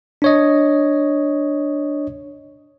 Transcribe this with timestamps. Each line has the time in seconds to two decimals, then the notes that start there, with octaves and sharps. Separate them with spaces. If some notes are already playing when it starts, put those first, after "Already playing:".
0.22 D4 C#5 D#5